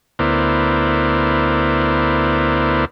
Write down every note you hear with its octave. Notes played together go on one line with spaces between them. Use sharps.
D2 B3 E4 A#4 C5 D5